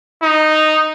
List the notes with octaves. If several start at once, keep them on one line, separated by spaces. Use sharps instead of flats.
D#4